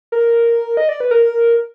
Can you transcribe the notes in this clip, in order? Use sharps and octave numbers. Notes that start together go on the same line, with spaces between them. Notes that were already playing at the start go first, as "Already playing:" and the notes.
A#4
D#5
D5
B4
A#4